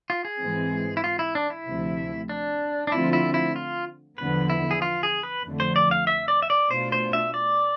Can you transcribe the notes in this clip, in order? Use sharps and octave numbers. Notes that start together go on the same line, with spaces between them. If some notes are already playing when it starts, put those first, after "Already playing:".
F4
G#4
G#2 E3 G#3 C4
E4
F4
E4
D4
E4
D2 C3 F3 A3
D4
D4
D3 F3 A3 C4 E4 F4
E4
E4
F4
E2 D3 F3 B3 B4
E4
G#4
F4
G#4
B4
F2 D3 F3 A3
C5
D5
F5
E5
D5
E5
D5
B2 A3 D4 F4 C5
C5
E5
D5